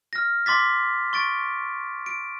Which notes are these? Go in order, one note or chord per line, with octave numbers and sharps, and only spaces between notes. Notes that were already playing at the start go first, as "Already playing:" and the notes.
F6 A#6
C6 D6 A6 B6
C#6 A6 D7
D7